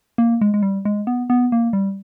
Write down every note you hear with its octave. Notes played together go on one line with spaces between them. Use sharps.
A#3
G#3
G#3
G3
G#3
B3
B3
A#3
G3